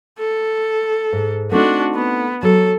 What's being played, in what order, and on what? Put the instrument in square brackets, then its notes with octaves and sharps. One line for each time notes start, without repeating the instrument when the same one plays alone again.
[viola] A4
[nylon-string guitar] G#2
[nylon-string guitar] A3 C4 D#4 [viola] D4 F#4
[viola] B3
[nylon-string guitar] F#3 [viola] A4